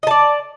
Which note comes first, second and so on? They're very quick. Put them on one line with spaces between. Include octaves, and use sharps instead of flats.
D#5 A5 D5